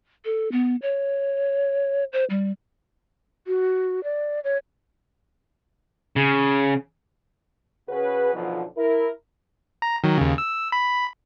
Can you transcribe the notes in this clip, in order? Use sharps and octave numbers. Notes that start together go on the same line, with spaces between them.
A4
B3
C#5
C5
G3
F#4
D5
C#5
C#3
C#3 C#4 F#4 G#4 B4
B1 B2 D3 E3 F3
E4 A#4
A#5
D#3 F#3
D#2 C#3
E6
B5